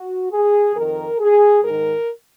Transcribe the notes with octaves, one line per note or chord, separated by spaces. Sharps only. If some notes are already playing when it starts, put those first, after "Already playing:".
Already playing: F#4
G#4
F2 D#3 A#4
G#4
G#2 D#3 A#4